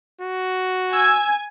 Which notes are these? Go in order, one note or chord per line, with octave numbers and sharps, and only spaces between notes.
F#4
G#5 E6 G#6